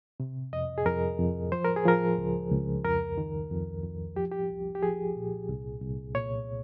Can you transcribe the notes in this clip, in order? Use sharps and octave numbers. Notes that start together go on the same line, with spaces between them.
C3
F2 D#5
G#4
F2 A#4
F2
F3 C5
A#4
G#4
F3 A#4
C#2
C#2
F2 A#4
D#3
F2
F2
F3 G4
G4
C2
G4
F3 G#4
A#2
C2
C2
A#2 C#5